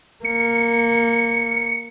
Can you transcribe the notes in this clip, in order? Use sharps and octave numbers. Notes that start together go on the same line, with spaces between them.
A#3 C#7